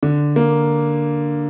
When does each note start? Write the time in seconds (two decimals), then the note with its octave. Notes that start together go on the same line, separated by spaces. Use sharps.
0.03 D3
0.36 A#3